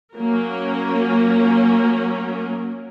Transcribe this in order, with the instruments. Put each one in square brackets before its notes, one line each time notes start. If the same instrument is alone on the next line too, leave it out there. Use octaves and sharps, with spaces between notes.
[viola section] F#3 A#3 C#4 A#4